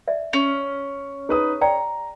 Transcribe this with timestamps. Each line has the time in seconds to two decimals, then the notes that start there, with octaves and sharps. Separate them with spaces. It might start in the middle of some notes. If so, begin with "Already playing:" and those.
0.08 D5 E5
0.33 C#4
1.29 D#4 G#4 B4 D#6
1.61 D5 G5 A#5